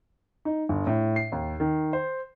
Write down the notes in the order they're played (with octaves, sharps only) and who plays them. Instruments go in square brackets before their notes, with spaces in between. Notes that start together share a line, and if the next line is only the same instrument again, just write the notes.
[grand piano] D#4
G1
A2
C7
D#2
D#3
C5